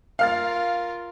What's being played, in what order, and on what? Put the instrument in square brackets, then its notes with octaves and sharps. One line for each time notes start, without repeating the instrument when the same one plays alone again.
[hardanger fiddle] F4 A#4 [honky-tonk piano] F5 F6 A6